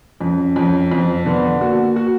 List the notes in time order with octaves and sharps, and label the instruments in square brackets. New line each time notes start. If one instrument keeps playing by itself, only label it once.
[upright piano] F2 [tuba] C#4
[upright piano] F2
[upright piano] F2 [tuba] C4
[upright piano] D3 [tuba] B3
[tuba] A#3 [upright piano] F#4
[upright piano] F#4